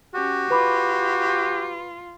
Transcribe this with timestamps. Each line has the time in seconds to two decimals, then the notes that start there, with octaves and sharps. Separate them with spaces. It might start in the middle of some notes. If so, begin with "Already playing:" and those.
0.14 C#4 F#4 G4
0.50 F4 B4 B5 D6